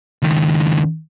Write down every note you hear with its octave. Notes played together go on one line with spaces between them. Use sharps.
C#2 D#3